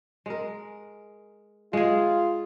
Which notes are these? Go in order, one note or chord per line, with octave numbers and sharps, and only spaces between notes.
G#3 A#4
G#3 F4 G#4